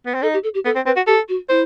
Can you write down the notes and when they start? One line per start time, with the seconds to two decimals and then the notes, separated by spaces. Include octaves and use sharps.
0.06 B3
0.14 C4
0.22 D#4 A4
0.34 G4
0.44 A4
0.54 G4
0.65 B3 A4
0.76 C4
0.86 C4 B4
0.96 F#4
1.07 G4 A4
1.29 F#4
1.49 E4 C5